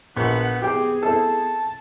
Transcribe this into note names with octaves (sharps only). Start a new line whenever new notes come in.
A#1 B3 F#5
B3 C4 G4 G#4 G5
C4 E4 A4 A5